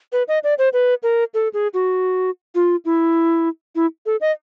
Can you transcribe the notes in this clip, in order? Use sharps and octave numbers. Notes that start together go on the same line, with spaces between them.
B4
D#5
D5
C5
B4
A#4
A4
G#4
F#4
F4
E4
E4
A4
D#5